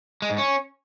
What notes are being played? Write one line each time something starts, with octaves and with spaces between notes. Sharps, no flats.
G#3
G#2
C#4